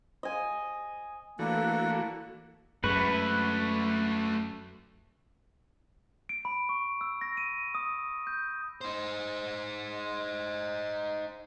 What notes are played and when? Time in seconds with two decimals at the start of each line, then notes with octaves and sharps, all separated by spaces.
0.23 D#5 G#5
1.39 E3 A3 A#3 D4 F#4 A4 B4
2.84 F#2 G#3 A3 F#4 B4
6.29 D7
6.45 B5
6.69 C#6
7.01 E6
7.21 A#6
7.37 D#7
7.75 D#6
8.27 G6
8.81 D#4 C5